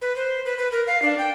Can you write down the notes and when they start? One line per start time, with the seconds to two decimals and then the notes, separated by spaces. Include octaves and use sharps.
0.02 B4
0.16 C5
0.45 B4
0.58 B4
0.72 A#4
0.87 F5
1.02 D4
1.18 G5